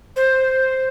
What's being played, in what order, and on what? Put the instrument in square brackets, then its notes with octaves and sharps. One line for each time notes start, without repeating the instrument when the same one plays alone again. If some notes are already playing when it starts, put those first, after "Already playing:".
[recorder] C5